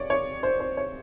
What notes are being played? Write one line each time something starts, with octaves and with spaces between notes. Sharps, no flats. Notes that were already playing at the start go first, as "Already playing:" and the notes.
Already playing: C#5 D5
C#5
C5
C5
C#5